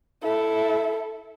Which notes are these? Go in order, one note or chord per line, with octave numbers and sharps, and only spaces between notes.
E4 A4